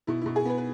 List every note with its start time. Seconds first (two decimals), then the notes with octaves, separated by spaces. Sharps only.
0.07 B2 E4
0.21 B2 E4
0.36 G#4
0.45 B3 B4
0.58 B4